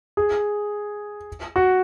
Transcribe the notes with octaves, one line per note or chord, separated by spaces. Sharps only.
G#4
F#4